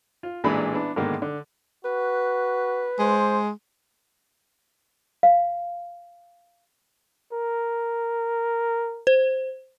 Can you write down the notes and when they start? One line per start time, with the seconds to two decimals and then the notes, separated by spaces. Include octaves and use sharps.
0.23 F4
0.44 A1 A#2 E3 G#3 D4 B5
0.74 B3 D4 E4
0.96 G#2 B2 D3 D#3 G#3 A#3
1.22 D3
1.85 F#4 B4
2.99 G#3 C5
5.23 F5
7.33 A#4
9.07 C5